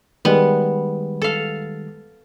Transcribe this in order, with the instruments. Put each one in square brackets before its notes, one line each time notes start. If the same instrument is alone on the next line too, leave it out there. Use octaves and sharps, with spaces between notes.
[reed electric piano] D#3 G3 G#3 [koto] B3
[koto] A4 F5